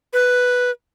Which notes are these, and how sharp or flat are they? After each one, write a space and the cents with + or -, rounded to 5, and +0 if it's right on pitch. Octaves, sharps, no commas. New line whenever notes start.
B4 +0